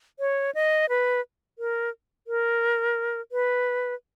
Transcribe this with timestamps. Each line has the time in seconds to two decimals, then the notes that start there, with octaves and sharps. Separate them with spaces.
0.19 C#5
0.55 D#5
0.89 B4
1.59 A#4
2.27 A#4
3.32 B4